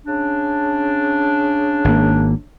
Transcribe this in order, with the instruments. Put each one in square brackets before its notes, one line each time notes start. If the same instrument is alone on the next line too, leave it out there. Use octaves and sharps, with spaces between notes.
[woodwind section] C#3 C#4 D4
[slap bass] G#1 A#3